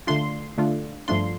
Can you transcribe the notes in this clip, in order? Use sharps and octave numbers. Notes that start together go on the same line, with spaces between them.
D3 A3 D4 F4 C6
D3 A3 D4 F4
G2 F3 A3 D4 F4 C6